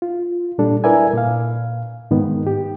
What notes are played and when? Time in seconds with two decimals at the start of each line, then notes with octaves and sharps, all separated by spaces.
0.02 F4
0.58 A#2 G3 D4 A4
0.84 E4 A#4 B4 D5 E5 G#5
1.13 A#2 F5
2.11 G#2 D#3 B3
2.47 G4